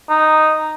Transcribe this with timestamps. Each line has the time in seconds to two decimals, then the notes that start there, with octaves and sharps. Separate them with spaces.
0.10 D#4